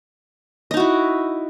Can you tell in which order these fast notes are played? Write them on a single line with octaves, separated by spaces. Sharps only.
D#5 D#4 F#4 E4